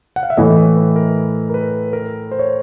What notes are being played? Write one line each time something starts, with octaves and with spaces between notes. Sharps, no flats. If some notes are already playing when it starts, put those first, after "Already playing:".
F#5
F5
E5
A2 E3 A3 C#5 D#5
B4
B4
A#4
A#4
B4
A#4
C5
C#5